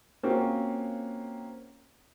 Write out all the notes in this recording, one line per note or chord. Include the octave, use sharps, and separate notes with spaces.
A#3 C4 C#4 F4 F#4